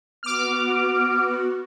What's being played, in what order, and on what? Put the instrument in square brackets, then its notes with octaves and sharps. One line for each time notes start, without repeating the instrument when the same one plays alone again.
[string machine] B3 F#4 [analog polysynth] D6 F6